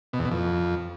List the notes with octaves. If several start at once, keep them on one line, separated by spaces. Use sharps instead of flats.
B2
E2
B2
F2